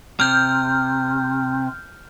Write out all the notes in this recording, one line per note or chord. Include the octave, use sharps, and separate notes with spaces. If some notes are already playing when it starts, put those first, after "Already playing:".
C3 F6 G6